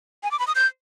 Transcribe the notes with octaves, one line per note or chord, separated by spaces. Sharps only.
G#5
D6
B5
D#6
G6